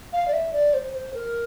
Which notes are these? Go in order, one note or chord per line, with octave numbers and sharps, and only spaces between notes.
F5
D5
E5
D5
C5
C5
A#4